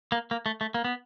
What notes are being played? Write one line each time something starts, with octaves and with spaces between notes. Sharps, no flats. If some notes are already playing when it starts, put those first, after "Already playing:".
A#3
A#3
A3
A3
A#3
B3